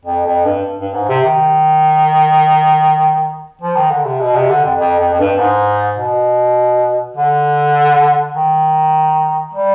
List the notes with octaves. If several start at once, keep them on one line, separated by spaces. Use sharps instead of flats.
F2
F2
G2
G2
G#2
C3
D#3
F3
D#3
D3
C3
B2
C3
D3
F2
F2
F2
F2
G2
G#2
B2
D3
D#3
G3